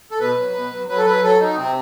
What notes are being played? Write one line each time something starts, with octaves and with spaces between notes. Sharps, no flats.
A4
B2 B4
F#3
B2
F#3
F#3 B4
A4
F#3 B4
F#3 A4
F#3 D#4
C3 C4